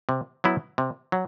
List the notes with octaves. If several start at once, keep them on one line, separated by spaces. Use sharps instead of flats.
C3
F#3 B3 E4
C3
F#3